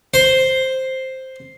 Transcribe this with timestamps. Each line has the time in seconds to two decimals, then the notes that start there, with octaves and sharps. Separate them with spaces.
0.14 C5